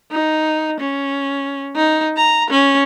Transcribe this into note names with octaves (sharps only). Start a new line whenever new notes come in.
D#4
C#4
D#4
A#5
C#4